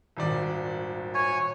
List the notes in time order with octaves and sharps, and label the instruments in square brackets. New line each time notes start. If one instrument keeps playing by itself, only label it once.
[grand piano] D#1 G#1 D5
[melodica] C#5 G#5